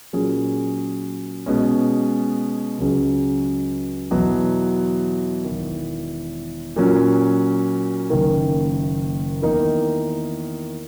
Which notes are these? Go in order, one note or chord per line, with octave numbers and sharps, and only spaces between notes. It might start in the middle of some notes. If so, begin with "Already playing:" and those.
A#2 F#3 C#4 G#4
B2 G#3 C#4
C#2 C#3 F#3 C#4 G#4
E2 B2 F#3
E1 E2 D#3
A#2 F#3 A#3 C#4
F#1 F#2 D#3 A#3
E2 D#3 A#3 D#4